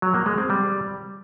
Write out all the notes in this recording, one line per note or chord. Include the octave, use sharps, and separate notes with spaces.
F#3
A#3
G#3
C4
G3